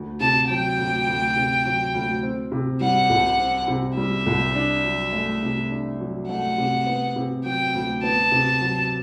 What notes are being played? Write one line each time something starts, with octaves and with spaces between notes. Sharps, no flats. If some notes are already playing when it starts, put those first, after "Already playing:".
Already playing: D2
C3 A5
F#3 G5
D2
D2
C3
F#3
D2
C4
C3
G3 F#5
C2
C4
C3
G3 E5
C2
D4
F#3
A3
C3
D4
F#3
A3 F#5
C3
B3
C3
F#3 G5
D2
B3 A5
C3
F#3